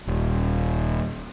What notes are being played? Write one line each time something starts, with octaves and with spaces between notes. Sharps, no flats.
D#1